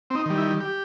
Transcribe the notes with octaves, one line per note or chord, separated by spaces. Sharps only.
C4
D#4
D#3 G3
E4
G4